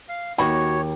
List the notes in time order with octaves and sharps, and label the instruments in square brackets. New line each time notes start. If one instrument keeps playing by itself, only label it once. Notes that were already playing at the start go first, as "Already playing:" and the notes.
[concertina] F5
[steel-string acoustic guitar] D#2 [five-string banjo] F#4 B5 [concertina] C#5